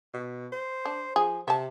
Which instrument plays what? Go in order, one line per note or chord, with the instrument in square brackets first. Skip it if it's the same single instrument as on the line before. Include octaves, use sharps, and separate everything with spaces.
[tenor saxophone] B2
C5
[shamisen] D4
[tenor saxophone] F3 [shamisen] G#4
[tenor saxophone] C3 [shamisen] E5 A5